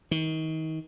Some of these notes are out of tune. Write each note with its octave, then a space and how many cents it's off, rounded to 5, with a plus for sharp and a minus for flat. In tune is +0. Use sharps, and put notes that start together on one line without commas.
D#3 +30